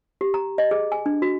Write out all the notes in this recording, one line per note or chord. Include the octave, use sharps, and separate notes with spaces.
G4
A#5
D#5
G#4
G#5
D4
F#4